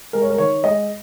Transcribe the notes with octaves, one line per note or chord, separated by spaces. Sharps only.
G#3 A#4
C#5
A#4
D#3 C#5
G#3 D#5